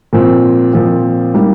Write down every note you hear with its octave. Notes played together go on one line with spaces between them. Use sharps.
A#2 F3 C4
A#2 F3 C4
G3 A#3 D#4